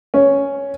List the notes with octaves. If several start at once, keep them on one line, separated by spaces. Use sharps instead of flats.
C#4